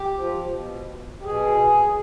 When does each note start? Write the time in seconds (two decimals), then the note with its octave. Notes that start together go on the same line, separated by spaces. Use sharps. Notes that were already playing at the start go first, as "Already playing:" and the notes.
Already playing: G4
0.18 F3
0.53 B2
1.20 G4
1.25 B2 G#4